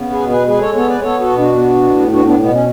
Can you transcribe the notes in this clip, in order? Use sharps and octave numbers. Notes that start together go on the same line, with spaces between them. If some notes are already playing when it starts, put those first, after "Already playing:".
Already playing: C#3 B3
G#4 B4
B2
G#4 B4
G#3 G#4 B4
A4 C#5
B3 A4 C#5
B4 D5
B3 A4 C#5
F#4 A4
B2
D4 F#4
B3
A2
B3 D4 F#4
B3 D4
B2 B3
C#4